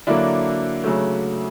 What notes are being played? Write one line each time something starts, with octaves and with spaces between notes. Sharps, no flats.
D3 F#3 A#3 D4 E4
C#3 F#3 A3